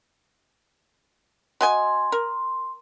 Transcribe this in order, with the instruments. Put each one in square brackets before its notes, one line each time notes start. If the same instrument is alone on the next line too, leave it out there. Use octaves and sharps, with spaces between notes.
[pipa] F#4 D#5 G#5 [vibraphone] C6
[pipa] A#4